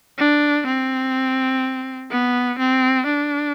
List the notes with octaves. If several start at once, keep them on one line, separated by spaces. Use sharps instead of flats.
D4
C4
B3
C4
D4